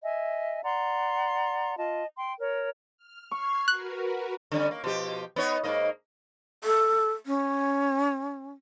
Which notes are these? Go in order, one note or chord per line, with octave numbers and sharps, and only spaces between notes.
D#5 E5 G#5
D5 F#5 A#5 C6
F4 D#5 A5
G5 C6
A#4 C#5
F6
C#6 F6 G#6 C7
F#4 A#4 B4 F#6
D3 G3 C#4
A#3
B2 F3 G4
B3 D#4 C#5
G#2 A#3 D#5
A4
C#4